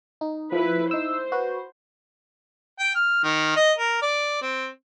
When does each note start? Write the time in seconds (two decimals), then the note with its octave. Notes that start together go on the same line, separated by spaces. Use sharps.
0.21 D#4
0.52 F3 E4 B4
0.91 D#4 C5 E6
1.32 F#4 B4
2.80 G5
2.95 F6
3.24 D#3
3.56 D#5
3.78 A#4
4.02 D5
4.42 C4